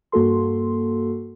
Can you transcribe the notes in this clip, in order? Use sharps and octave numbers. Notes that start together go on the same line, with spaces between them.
G2 A#3 F#4 A4 C6